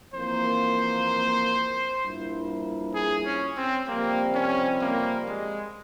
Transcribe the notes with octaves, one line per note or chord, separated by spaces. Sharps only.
F2 E3 A#3 C5
G2 F3 A#3 E4
G#4
C#4
C4
F2 C3 G3 A#3 C4
C#4
A#3
G#3